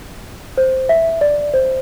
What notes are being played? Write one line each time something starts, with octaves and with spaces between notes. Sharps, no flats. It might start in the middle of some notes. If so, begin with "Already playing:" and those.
C5
E5
D5
C5